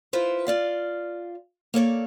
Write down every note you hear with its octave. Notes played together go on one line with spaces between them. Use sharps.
E4 F4 B4 C5
F4 D5 F5
A#3 A4 C#5 D5